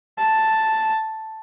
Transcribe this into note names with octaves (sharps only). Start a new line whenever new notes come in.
A5